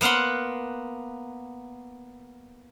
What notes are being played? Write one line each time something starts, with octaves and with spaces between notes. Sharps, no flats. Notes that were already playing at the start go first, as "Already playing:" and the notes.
A#3 B3 F5 F#5 C6